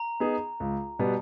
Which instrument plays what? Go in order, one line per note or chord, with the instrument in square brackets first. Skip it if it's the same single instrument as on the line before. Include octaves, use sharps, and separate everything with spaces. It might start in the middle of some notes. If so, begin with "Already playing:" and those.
Already playing: [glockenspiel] A#5
[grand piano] B3 D#4 G#4
C#2
B2 G3 B3